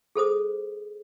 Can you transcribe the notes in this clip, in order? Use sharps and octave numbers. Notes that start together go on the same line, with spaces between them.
G#4 A4 C5 D#6